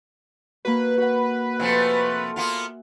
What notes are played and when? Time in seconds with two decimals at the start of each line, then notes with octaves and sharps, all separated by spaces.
0.65 A#3 F#4 B4
0.97 F#4 F#5
1.60 C3 F3 A3 E5 F#5 G#5
2.36 A#3 B3 F4